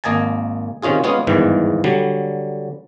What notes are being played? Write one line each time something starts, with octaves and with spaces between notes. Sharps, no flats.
G#1 A#3 D#5 G#5 A5
C3 D#3 C#4 F4 G#4
G#3 B3 C#4 F4 G#4
G1 E2 G#2 D#3 E3
D3 F#3 G3